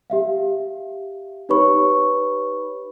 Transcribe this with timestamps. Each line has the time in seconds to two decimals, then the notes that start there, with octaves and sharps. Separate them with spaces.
0.10 G4 E5 F5
1.49 D#4 G4 B4 C#5 B5 C#6